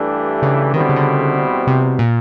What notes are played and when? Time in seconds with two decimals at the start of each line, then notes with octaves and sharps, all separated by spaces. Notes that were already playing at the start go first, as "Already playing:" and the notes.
Already playing: G2 E3 A3 D4 G4
0.42 C#3
0.73 E2 B2 D#3 G3 C4
0.81 D3
0.89 C#3
0.96 D3
1.67 C3
1.99 A#2